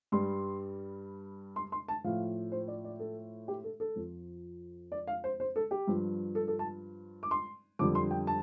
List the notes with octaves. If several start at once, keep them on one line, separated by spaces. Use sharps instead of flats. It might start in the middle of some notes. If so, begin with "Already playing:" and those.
G2 G3 C6
C6
C6
A5
A2 F3 F5
C5
D5
D5
A4
G4
A4
A4
F2 F3
D5
F5
C5
C5
A4
G4
G2 F3
A4
A4
A5
D6
C6
F2 D3 G3 D6
C6
G5
A5